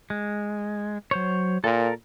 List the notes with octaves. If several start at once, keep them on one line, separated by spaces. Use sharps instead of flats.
G#3
F#3 C5 C#5
A#2 A4 A#4